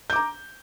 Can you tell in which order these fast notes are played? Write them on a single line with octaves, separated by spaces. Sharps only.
G6 D6 A#5